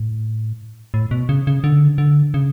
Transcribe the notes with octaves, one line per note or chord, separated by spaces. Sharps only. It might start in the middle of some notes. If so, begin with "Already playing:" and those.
Already playing: A2
A2
B2
C#3
C#3
D3
D3
C#3